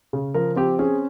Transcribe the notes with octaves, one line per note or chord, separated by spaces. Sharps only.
C#3
F3 A#4
C4 G4
C#4 G#4